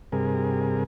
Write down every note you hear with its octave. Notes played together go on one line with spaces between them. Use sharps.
G2 C3 G#4 A#4